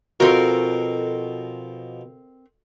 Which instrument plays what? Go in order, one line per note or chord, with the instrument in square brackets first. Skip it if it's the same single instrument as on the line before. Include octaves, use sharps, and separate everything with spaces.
[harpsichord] B2 F3 [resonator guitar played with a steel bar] C4 A#4 [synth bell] F#4 A4